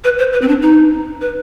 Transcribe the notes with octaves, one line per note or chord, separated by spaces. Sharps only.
B4
C5
B4
C4
D4
D#4
B4